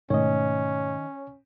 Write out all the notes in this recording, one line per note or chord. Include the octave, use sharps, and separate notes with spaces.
G#2 B2 D#3 A3 C#4 C#5 D#5